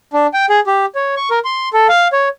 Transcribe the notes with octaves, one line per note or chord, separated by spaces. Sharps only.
D4
G5
G#4
G4
C#5
C#6
A#4
C6
A4
F5
C#5